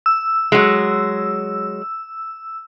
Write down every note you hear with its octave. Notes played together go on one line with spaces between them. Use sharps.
E6
F#3 G#3